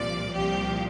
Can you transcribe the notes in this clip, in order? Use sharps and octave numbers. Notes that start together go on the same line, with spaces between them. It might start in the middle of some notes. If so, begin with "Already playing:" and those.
Already playing: C2 A#2 F3 D5
C2 A#2 F3 G4